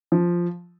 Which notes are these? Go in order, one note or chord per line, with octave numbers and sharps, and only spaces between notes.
F3